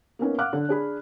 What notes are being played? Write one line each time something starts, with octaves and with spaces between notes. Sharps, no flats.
A#3 B3 C#4 D#4
F5 F#5 D6 F6 F#6
D3
D4 G#4 B5